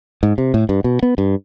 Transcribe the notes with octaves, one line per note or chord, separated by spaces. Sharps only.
G#2
C3
A2
G2
B2
B3
G2